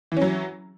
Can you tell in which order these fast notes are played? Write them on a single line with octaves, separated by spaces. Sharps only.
E3 C#4 F#3